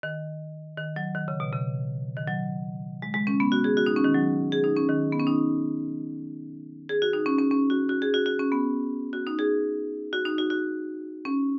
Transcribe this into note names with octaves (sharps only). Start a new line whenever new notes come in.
D#3
D#3
F#3
D#3
C#3
B2
C#3
D#3
F#3
G#3
G#3
C#4
B3
F#4
G#4
F#4
D#4
C#4
D#3
F#3
G#4
D#4
C#4
D#3
B3
C#4
D#4
G#4
F#4
D#4
C#4
C#4
C#4
F#4
F#4
G#4
F#4
F#4
C#4
B3
F#4
D#4
G#4
F#4
D#4
F#4
F#4
C#4